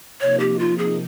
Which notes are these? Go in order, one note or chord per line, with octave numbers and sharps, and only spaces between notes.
C3 F3 A#3 D#4 C#5
G4
F4
G#4